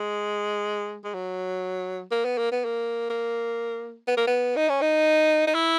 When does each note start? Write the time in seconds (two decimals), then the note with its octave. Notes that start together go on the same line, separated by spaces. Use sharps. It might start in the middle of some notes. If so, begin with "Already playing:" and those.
Already playing: G#3
1.04 G#3
1.14 F#3
2.11 A#3
2.25 B3
2.38 A#3
2.52 B3
2.65 A#3
3.10 A#3
4.07 B3
4.17 A#3
4.27 B3
4.56 D#4
4.69 C#4
4.82 D#4
5.47 D#4
5.54 E4